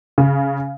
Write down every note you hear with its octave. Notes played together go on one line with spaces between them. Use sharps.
C#3